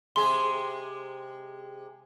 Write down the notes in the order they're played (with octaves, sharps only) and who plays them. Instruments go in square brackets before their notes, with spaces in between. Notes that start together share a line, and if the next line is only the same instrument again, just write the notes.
[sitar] C3 G#3 G#4 [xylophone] C6